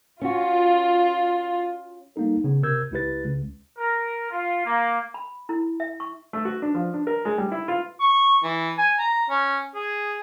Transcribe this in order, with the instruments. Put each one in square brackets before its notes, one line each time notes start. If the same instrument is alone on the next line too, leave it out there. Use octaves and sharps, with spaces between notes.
[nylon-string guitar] C#4 F#4 [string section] F4
[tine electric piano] G3 A#3 B3 D#4 A4
C#3 B3
C3 A#4 E6 G6 G#6
C#2 G#3 E4 G4 B4 A6
C#2
[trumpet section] A#4
F4
A#3
[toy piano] B5
E4
E5
C#6
[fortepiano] A3
F#4
D4
F3
D4
A#4
G#3
G3
E4
F4
[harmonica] C#6
E3
G#5
A#5
C#4
G#4